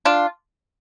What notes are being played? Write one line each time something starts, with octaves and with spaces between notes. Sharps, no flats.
D4 F4